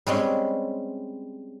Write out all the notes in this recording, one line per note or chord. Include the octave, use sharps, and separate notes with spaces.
G3 G#3 C4 C#4